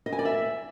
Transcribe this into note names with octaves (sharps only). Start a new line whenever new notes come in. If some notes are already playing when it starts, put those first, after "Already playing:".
D#5
G#5
D5
E5